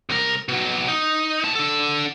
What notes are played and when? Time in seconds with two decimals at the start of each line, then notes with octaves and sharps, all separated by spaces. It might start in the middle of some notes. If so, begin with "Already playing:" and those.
0.09 C2 A#4
0.48 B2 F#3
0.88 D#4
1.44 B3 A5
1.55 D4 A4